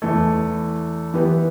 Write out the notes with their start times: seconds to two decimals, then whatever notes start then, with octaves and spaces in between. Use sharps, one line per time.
0.02 E2 E3 A3
1.14 E3 B3 G4 B4